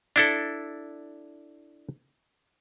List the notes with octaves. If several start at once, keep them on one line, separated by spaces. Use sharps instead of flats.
D4 E4 A4